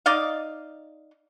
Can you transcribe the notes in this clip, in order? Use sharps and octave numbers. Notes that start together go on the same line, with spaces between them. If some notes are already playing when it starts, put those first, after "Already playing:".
D#4 D5 D#5 F5